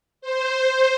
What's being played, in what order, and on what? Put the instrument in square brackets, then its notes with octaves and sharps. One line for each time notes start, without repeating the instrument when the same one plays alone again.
[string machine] C5